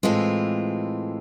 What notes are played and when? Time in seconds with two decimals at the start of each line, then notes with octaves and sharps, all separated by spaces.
0.03 A2 E3 G#3 C4 F4